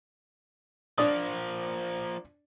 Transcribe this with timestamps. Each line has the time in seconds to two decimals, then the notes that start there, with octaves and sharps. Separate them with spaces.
0.98 F3 A#3 D4 D5 D#6